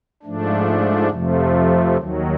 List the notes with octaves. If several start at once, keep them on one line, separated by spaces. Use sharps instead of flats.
G#2 F3 A3 D4
F2 C3 F3 A3
D#2 D#3 F#3